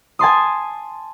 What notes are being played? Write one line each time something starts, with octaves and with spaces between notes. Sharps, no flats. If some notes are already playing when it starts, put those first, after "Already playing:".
G#5 A5 C6 D#6